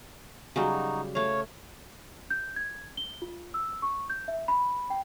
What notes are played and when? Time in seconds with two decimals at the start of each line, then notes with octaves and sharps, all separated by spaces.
0.56 C#3 F#3 G3 D#4 F#4
1.15 A3 C#5 F5
2.30 G6
2.56 G#6
2.97 G7
3.22 F4
3.54 E6
3.82 C#6
4.10 G6
4.28 E5
4.48 B5
4.90 G5